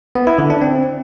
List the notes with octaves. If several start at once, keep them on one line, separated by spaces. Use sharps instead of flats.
B3
E4
D3
D4
C4